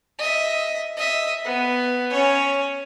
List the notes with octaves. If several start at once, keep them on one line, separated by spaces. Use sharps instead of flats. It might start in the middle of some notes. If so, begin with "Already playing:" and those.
D#5 E5
D#5 E5
B3
C#4 C#5